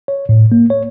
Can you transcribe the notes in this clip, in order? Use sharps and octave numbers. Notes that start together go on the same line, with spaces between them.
C#5
A2
A#3
C#5